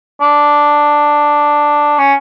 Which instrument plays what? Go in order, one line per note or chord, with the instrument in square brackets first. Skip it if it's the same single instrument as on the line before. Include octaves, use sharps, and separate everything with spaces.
[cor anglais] D4
C#4